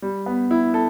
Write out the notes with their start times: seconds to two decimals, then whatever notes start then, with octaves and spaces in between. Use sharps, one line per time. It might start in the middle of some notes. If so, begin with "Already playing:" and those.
0.02 G3
0.26 B3
0.51 E4
0.74 A4